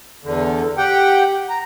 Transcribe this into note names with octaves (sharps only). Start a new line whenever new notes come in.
E2 D3
G4 F#5 G5
A#5